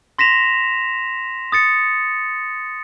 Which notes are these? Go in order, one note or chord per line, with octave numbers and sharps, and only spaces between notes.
C6 A#6 B6 E7 F7
D#6 A6 C#7